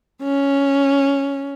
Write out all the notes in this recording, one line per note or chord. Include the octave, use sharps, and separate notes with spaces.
C#4